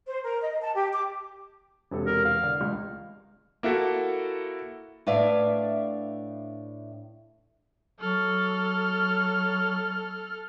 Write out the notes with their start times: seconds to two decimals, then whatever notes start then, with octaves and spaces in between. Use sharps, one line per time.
0.07 C5
0.24 A#4
0.42 D#5
0.61 A5
0.76 G4
0.92 D6
1.91 E1 C3 A4
2.06 A#4
2.25 E2 F5
2.42 D3 D5
2.61 C#2
3.63 A#3 E4 F#4 A4
5.07 A2 D4 B4 D5 E5 F5
8.00 F#3 A4 F6